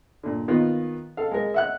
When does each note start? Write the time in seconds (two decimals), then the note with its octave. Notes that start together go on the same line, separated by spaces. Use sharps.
0.23 A#2 D3
0.48 D#3 A#3 B3 F4
1.17 A4 F5
1.31 G#3 A#4
1.54 E5 F#5 F#6